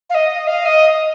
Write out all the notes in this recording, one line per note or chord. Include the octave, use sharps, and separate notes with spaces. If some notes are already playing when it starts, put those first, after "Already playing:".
F5
D#5
F5
D#5